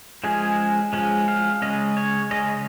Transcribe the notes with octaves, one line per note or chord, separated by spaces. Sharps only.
F3 G#3 C#4 G#4
F3 G#3 C#4
F5
C#3 G#3 C#4 D#5
C#5
C#3 G#3 C#4 D#5